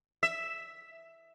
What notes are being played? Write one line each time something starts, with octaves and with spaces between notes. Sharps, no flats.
E5